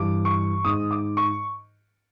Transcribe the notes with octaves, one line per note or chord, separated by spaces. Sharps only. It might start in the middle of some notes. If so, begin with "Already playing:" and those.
Already playing: G2 E3 D6
C#6
G#2 D#3 D#6
D6
C#6